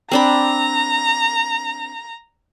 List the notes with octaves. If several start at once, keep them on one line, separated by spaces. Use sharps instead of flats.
C4 D4 A#5 B5